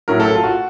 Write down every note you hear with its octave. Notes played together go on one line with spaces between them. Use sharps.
A2 F#3 A3 C#4 E4 A#4
A4
F4
F#4